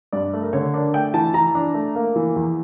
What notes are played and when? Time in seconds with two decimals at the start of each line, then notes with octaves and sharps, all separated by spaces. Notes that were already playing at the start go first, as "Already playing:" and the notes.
0.13 G2 D5
0.33 A3
0.43 A#4
0.53 D3 C#5
0.73 D4 A#4
0.94 A3 G5
1.14 E3 A5
1.34 E3 A#5
1.55 D4
1.74 A3
1.96 A#3
2.16 E3
2.36 E2